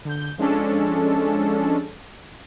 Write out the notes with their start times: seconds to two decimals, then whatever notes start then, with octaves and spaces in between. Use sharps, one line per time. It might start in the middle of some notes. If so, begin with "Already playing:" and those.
0.05 D3 G6
0.38 F3 G#3 C#4 D4 A4